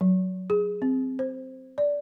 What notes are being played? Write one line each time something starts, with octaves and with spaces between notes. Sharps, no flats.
F#3
G#4
C4
C5
D5